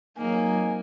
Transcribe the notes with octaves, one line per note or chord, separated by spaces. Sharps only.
G#1 F#3 A#3 D#4 G#5